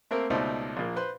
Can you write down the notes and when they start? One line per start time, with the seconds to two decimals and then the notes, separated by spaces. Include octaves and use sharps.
0.11 A3 A#3 C4 A#4
0.30 C#2 B2 A3 D#4 C5 D5
0.77 A#1 A#2 A#3
0.96 B4 C5 C6